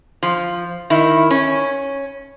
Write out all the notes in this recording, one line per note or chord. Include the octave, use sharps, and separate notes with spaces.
F3
D#3 E4
C#4